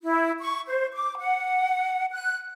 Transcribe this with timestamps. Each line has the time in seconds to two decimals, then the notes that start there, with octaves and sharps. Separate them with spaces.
0.03 E4
0.39 C#6
0.67 C5
0.93 D6
1.18 F#5
2.11 F#6